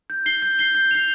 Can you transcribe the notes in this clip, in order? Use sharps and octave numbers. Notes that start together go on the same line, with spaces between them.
G6
C7 G7
G6
C7 G7
G6
C7 F7